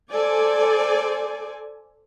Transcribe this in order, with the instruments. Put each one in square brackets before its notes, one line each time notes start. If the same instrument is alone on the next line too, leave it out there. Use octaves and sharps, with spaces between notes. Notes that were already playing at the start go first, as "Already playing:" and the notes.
[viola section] A4 C5 D5 G#5